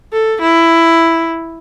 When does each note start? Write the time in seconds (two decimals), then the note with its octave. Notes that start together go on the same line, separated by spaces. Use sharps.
0.13 A4
0.42 E4